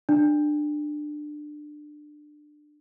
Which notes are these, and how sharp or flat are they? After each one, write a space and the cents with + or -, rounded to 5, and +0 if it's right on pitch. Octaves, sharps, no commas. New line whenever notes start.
D4 +20